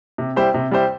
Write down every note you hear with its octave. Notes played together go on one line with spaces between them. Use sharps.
C3
G3 E4 G4 C5
C3
G3 E4 G4 C5